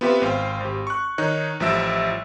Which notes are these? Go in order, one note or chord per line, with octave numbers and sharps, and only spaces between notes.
B3 C4 F4 G4 B4 E5
G#1 C5 F5 G5
G#1 G4
C#6 F#6
D#3 D#4 C#5 F#6
A1 F3 G3 E5 E6 D7